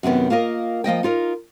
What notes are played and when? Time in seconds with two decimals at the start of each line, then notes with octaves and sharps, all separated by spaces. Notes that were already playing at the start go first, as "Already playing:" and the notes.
0.03 F#2 C3 D#3 B3
0.30 A#3 F4 A#4 D#5
0.84 F3 A#3 D#5 G5
1.03 D#4 F4 A#4